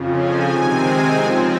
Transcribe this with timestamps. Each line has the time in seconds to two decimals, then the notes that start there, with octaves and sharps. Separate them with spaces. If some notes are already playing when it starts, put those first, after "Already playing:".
Already playing: F2 C#3 F3
0.16 G#5
0.48 C3 D#3 G#3 C4 G#5
1.14 C#3 F3 C4 G#5